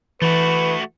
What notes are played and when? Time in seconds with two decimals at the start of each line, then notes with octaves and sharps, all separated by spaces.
0.22 E3 A3 F#4 B4